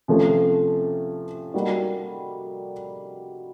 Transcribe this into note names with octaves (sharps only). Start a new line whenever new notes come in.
C3 F3 A3 C#4
G3 A#3 D#4 F#4